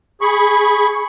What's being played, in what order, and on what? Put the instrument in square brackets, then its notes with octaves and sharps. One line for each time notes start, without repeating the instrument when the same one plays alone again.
[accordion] G#4 B5 C#6